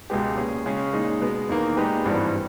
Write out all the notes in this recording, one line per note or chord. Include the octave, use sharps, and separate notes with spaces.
C#2 B2 G#3 B3 G4
A#2 G#3 C#4 G#4
C#3 G#3 C#4
A#2 G#3 D#4
B2 G#3 B3
E2 D#3 A#3
A#2 G#3 D#4 G4 B4
G#1 G2 E3 G3